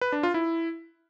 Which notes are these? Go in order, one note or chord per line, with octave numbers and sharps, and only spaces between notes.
B4
D4
F4
E4